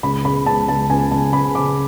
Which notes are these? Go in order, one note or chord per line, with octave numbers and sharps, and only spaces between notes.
C#2 B5
C#3 B5
C#2 A5
C#2 A5
C#2 G#5
C#2 A5
C#3 B5
C#3 D6